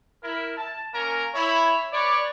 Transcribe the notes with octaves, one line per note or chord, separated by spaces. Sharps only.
E4 A#4
A5
A#3 C#4 A#4 A#5
E4 C#5
B4 C#5 D5